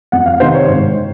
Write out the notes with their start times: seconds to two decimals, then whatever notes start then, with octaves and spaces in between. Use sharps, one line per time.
0.12 F2 F#5
0.26 F5
0.40 C3 D#3 C5
0.54 C#5
0.68 G#2
0.95 D#3